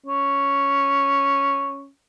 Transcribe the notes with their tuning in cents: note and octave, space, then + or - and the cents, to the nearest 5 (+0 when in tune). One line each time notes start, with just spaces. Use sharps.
C#4 +0